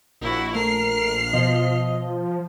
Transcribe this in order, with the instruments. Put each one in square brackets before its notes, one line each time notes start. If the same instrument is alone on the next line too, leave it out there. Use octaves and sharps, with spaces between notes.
[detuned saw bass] A#1 [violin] E4 F#4
[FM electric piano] A3 [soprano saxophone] A#4 [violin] F6 C7
[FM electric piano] B2 [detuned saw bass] F3 [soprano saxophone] D#5